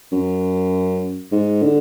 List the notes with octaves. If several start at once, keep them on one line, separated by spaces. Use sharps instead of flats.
F#2
G#2
D3